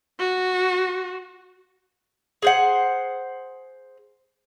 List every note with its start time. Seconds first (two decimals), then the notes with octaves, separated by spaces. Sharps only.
0.19 F#4
2.42 G#4 C5 F#5